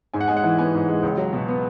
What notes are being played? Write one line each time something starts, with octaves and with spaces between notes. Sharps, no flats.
G#2 G#5
F#5
G#3 G#5
F#5
E3
B3 G#5
G#2
G#3
C#2
F#3
B2
B3